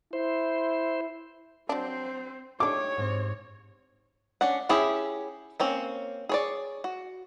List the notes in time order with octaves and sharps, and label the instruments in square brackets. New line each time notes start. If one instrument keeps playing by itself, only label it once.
[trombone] E4 [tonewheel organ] C5
[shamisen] F#3 D4 [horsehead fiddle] C4 C5
[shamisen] A3 D4 [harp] D#4 G4 [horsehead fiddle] C#5 [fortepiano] D6
[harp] G#2 C4
[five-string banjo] C#4 D4 F#5
C#4 E4 G4 G#4
A#3 C4 C#4
G#4 C#5 D5
F#4